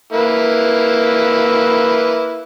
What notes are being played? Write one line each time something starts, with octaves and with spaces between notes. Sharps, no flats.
A#3 E4 B4